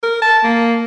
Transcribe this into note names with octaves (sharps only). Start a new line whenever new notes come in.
A#4
A5
A#3